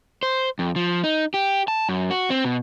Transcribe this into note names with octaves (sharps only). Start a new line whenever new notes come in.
C5
F2
F3
D#4
G4
A5
F#2
F#4
C4
B2